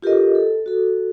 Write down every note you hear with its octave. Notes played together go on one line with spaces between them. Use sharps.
F4 G4 A4 A#4 D#5
A4
F#4 A4